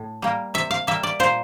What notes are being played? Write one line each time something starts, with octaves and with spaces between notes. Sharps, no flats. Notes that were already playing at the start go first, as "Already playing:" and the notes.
Already playing: A2
G3 A#3
C3 E5
F5
G3 A#3 E5
D5
A#2 C5